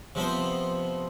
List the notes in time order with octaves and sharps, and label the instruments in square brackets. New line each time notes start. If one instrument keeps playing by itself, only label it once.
[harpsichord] C3 F3 B3 C5